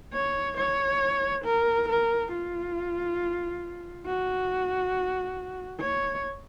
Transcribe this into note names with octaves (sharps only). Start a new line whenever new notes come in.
C#5
C#5
A#4
A#4
F4
F#4
C#5